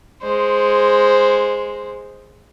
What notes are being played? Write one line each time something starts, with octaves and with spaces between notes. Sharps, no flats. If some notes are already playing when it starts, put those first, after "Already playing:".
G#3 C5